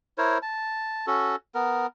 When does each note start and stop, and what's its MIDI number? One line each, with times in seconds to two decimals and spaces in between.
0.18 0.38 64
0.18 0.38 70
0.18 0.38 72
0.18 0.38 73
0.42 1.06 81
1.07 1.36 61
1.07 1.36 66
1.07 1.36 69
1.55 1.87 59
1.55 1.87 70